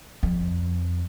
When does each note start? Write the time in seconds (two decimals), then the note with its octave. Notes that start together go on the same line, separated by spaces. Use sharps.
0.23 F2